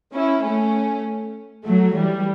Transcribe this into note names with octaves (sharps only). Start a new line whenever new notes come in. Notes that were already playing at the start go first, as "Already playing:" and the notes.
C#4 E4
A3 C#4
F#3 A3
E3 G3